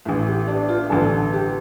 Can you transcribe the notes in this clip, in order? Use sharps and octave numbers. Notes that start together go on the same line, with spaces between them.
A1 A2
G4
D4
F4
A1 G2 D3 A4
G4